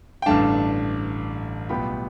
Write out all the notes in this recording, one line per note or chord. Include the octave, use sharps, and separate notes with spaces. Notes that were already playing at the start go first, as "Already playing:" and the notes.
G5
A1 G2 D3 A3 D4 F5 A5
B1 A2 G3 B3 F4 G5 B5